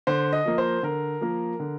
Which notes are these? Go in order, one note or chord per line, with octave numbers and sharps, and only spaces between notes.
D3 C5
D#5
F3 A#3
C5
D3 A#4
F3 A#3
D3